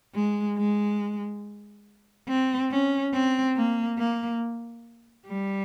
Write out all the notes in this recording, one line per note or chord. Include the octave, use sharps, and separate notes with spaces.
G#3
G#3
C4
C#4
C4
A#3
A#3
G3